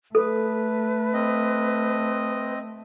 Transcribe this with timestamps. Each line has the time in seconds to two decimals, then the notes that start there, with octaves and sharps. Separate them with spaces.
0.15 A3 A4 B4
1.13 C4 D#5